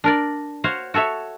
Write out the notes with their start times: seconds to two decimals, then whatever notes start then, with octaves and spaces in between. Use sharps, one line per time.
0.04 D4 A#4 D5
0.64 F#4 C5 C#5 F5
0.94 F#4 A4 C#5 E5